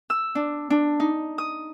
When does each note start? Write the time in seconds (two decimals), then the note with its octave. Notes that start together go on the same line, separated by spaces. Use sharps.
0.10 E6
0.35 D4
0.70 D4
1.00 D#4
1.38 D#6